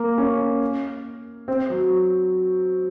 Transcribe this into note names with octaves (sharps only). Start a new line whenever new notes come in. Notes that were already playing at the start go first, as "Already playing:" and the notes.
Already playing: A#3
C#4
C4
F#3